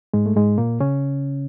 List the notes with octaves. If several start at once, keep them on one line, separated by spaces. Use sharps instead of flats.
G#2 G#3
A3
G#2 G#3
A#2 A#3
C#3 C#4